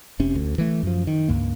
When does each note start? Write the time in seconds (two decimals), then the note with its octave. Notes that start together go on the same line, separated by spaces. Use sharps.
0.19 F1 C3 C#4
0.35 D2
0.58 E3 A3
0.83 F#2 F3
1.07 D#3
1.28 C#2 G2 A#3